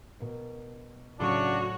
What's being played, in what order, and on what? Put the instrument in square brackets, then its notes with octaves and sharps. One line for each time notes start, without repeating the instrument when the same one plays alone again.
[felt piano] B2 A#4
[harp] A2 F#3 C#6 [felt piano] C#3 [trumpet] D4 [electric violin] F#4 C#5